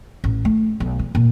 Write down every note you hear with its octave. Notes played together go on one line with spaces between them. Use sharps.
A1
A3
B1
E2
A#2